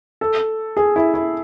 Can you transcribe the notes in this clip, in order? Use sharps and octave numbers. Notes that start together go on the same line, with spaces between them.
A4
G#4
E4
E4